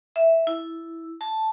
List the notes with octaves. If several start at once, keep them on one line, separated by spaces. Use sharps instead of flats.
E5
E4
A5